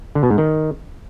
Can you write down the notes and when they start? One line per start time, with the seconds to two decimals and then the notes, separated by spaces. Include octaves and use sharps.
0.15 D3
0.23 B2
0.31 G#2
0.38 D#3